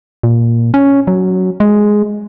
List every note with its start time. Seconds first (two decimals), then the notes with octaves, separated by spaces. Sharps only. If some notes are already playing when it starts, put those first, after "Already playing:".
0.23 A#2
0.74 C#4
1.07 F#3
1.60 G#3